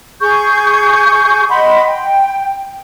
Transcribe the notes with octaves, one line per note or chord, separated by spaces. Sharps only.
G#4 C#6 G6
D#5 F#5 B5 C6
G5